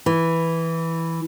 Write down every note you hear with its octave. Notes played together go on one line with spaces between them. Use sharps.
E3